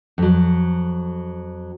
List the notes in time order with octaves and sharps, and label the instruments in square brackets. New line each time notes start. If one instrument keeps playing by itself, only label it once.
[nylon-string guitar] F2 F#3